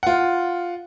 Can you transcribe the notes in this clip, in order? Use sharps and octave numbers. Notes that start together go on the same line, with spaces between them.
F4 F#5